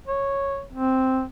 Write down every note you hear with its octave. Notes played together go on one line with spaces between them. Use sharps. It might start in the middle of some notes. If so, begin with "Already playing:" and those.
C#5
C4